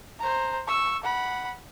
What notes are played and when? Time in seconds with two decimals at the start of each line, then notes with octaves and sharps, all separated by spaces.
0.20 C5 A#5
0.67 C#6 E6
1.04 F#5 B5